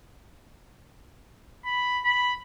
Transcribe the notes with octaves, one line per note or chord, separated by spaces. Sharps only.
B5
B5